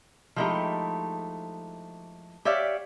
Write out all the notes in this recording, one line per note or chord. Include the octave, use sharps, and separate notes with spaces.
F3 G#3 A3 D#4 E4 G4
G4 C#5 D5 E5 F5